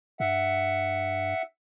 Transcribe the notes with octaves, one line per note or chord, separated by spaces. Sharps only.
G2 E5 F#5